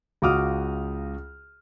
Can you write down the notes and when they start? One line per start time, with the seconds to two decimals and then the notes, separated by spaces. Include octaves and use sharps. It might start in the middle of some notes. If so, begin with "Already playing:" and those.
0.22 C#2 F#4 F5 D6 D#6 F6